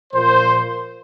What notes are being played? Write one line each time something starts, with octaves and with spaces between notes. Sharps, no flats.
A#2 F3 A#3 C5